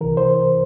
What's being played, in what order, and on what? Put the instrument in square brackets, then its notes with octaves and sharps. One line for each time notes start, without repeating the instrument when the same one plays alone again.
[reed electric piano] C2 C3 E3 A#4
C5